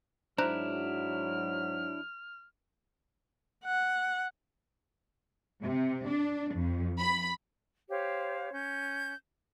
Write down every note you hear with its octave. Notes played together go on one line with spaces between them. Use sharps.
G#2 F#3 D4 E4 C5 A#5 F6 F#6
F#5
C3
D4
F2
B5
G4 C5 C#5 F5
C#4 G6